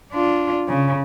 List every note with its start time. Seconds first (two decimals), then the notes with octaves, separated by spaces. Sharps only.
0.13 D4 F4
0.68 C#3